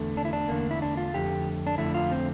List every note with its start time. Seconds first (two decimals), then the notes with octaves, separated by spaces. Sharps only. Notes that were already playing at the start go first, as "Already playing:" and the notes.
Already playing: E2 D3 A3
0.17 D4
0.25 E4
0.33 D4
0.49 E2 D3 A3 A#3
0.71 E4
0.82 D4
0.97 F4
1.13 F2 D3 A3 G4
1.67 D4
1.78 F2 D3 A3 E4
1.94 F4
2.11 C4